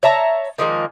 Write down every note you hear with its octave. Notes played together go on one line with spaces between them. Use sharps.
C#5 E5 A5 A#5
D#3 F3 G#3 A#3